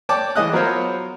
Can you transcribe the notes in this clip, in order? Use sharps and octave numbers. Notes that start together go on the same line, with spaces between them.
C#5 D5 G5 A5 D6
E3 G#3 D#5 D#6 F#6
F#3 B3 F4 A#4 C5 C#5